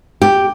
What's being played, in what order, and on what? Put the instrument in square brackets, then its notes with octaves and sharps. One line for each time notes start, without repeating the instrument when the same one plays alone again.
[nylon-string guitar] G4